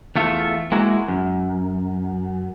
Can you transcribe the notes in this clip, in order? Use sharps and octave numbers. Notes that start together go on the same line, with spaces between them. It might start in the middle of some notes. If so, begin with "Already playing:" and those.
E2 A3 F4 E5
G#3 A#3 E4 F#4
F#2